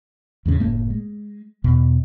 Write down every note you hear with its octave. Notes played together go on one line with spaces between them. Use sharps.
E2 A2 C#3
F#1 A2 A3 A#3
G#3
E2 B2